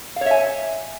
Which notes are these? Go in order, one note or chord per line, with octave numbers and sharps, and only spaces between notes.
C#5 E5 F5 G#5